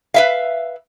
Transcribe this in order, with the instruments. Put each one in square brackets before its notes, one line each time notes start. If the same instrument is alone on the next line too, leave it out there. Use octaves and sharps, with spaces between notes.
[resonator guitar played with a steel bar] B4 E5 F5